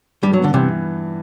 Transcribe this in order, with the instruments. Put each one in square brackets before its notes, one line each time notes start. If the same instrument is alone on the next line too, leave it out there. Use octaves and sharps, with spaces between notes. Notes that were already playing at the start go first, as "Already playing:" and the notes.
[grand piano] G2 [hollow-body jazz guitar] G3
[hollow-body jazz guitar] F#3
[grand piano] B3
[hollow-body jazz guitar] D3
[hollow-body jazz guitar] C3 [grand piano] E3